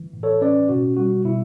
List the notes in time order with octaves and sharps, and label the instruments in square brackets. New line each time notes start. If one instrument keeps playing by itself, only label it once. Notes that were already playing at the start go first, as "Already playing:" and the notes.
Already playing: [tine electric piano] E3
A2
A4 C#5
C#4 B4 D5
B2 F#4
G3 F#4
B2 E4